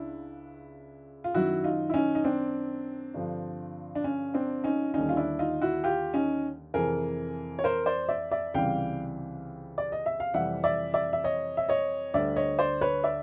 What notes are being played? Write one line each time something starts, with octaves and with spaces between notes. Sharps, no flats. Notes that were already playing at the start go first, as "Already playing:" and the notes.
Already playing: C#2 C#3 D4 E4
F4
F#2 D#3 F#3 E4 F#4
D#4 F4
E4
C#4 D#4
D#4
C4 D4
G2 D3 F3
D4
C#4
C4 D4
C#4 D#4
D#2 D3 G3 C#4 D#4
F4
D4 E4
D#4 F4
E4 F#4
F4 G4
C#4 D#4
F2 C3 E3 G#4 A#4
C#5
A#4 C5
C5 D5
D5 E5
D5 E5
C#2 C3 E3 G3 F5 G5
D5
D#5
E5
F5
F2 C3 E3 G3 E5 F#5
D5 E5
D5 E5
E5
C#5 D#5
E5
C#5 D#5
D2 D3 G3 D5 E5
C#5 D#5
C5 D5
B4 C#5
D5 E5